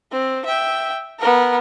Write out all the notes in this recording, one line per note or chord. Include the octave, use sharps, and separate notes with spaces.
C4
E5 G5
B3 A#4